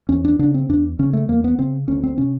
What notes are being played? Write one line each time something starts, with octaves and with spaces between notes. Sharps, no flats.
E2 C#4
D4
C#3 D4
C4
E2 D4
C#3 C#4
A3
E2 A#3
B3
C#3 C4
D2 C#4
C4
C3 C#4